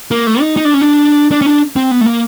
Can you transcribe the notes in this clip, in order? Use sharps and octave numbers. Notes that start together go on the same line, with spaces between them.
A#3
A3
D#4
D#4
D4
C#4
D4
D4
C#4
D4
C4
B3
A3
A#3